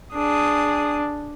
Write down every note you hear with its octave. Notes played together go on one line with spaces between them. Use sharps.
D4 G#4 D#6